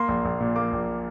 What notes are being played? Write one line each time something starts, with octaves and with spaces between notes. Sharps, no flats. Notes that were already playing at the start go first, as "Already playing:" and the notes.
Already playing: A#3 C6
A#1
A#1
A#2
A#3 D6
A#1